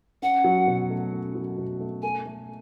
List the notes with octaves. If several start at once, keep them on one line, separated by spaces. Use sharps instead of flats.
C#4 F#5
F#3
B2
A3
C#4
F#3
B2
A3
A4 G#5
A3